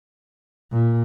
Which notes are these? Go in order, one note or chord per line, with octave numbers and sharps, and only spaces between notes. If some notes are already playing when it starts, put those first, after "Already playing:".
A#2